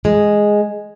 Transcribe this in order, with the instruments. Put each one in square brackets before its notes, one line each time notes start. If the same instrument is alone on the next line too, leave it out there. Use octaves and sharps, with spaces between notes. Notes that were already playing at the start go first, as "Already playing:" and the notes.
[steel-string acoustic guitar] G#3